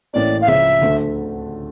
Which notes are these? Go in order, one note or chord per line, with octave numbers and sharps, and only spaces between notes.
A1 A2 E3 A#3 C#4 D5
F5
C#2 C#3 F3 E5
D2 D3 A3